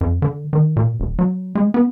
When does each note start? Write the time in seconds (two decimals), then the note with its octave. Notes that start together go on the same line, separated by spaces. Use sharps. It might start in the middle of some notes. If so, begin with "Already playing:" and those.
0.01 F2
0.22 D3
0.53 D#3
0.76 A#2
1.00 D#1
1.19 F#3
1.55 G#3
1.74 B3